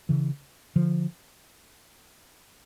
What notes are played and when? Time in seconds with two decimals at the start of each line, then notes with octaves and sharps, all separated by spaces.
0.09 C#3 E3
0.76 D3 F3